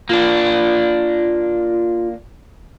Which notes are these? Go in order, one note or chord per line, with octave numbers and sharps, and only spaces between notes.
A#3 D4 F4